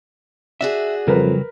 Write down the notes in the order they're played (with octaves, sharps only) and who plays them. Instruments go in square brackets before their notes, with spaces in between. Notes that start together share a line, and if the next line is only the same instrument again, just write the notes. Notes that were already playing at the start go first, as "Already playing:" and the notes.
[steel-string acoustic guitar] D4 F#4 G#4 [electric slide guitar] E5
[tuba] F2 [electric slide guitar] C#3 F#3 G3 [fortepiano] A#4 B4